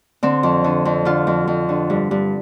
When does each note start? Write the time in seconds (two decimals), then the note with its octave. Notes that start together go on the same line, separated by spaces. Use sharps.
0.23 D3 C4
0.43 F2
0.64 D3
0.85 F2
1.05 D3 F4
1.27 F2
1.47 F2
1.69 D3
1.90 G2
2.11 G2